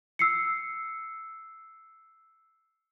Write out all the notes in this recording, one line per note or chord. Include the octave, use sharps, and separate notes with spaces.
E6 C7 C#7